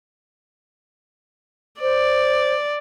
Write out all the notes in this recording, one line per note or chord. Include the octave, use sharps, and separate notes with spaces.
C5 D5